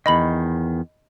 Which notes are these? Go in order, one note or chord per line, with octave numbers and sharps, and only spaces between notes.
E2 D#3 D#5 B5 F#7